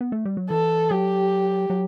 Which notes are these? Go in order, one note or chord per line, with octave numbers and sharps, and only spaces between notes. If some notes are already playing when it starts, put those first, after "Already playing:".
B3
A3
G3
F#3
E3 A4
F#3 G4
F#3